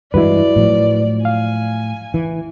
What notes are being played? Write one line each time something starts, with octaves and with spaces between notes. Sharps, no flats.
G2 E3 G#3 E4 F#4 B4 D5
A2 F3 F#3
F5 G#5
E3